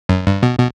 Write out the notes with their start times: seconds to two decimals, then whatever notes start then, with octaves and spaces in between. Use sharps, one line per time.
0.09 F#2
0.27 G2
0.43 B2
0.59 B2